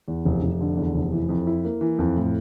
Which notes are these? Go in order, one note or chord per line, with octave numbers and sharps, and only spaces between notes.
E2
F1
F1
D3
E2
F1
E3
F2
E4
A#3
E3
F2
A2